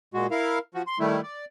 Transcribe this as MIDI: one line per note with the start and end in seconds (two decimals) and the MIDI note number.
0.14 0.27 46
0.14 0.27 56
0.14 0.27 66
0.31 0.58 64
0.31 0.58 70
0.31 0.58 77
0.75 0.82 53
0.75 0.82 66
0.87 0.99 84
1.00 1.21 51
1.00 1.21 55
1.00 1.21 57
1.00 1.21 64
1.23 1.45 74